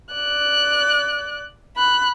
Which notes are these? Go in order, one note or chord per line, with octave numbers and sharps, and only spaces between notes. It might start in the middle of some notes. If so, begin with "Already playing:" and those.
D5 F#6
B5 F#6